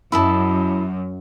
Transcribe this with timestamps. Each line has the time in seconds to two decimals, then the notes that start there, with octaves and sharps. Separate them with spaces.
0.12 F#2 E4 D#5 A5